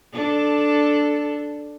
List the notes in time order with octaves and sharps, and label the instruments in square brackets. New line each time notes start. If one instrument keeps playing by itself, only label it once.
[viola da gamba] D4 A4